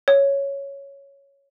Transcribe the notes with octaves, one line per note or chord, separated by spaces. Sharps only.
C#5